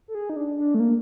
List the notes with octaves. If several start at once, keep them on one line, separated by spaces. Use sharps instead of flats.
A4
G#4
D#4
D4
D4
A3
A#3